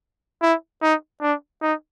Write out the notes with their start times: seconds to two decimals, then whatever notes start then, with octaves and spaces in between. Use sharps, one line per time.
0.42 E4
0.82 D#4
1.21 D4
1.61 D#4